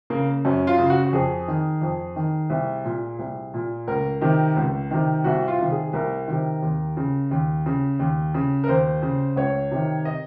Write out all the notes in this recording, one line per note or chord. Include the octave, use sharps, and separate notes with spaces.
C#3 A#3
F#2 C#4
F4
C#3
F#4
F#4
F2 G#4
D#3
F2
D#3
C2
A#2
C2
A#2
C#2 A#4
C3 D#3
C#2
C3 D#3
C2 F#4
F4
C3 D#3
G#4
C2 A#4
C3 D#3
D#2
C#3
D#2
C#3
D#2
C#3
A#4
D#2 C5
C#3
C#2 C#5
C3 D#3
D#5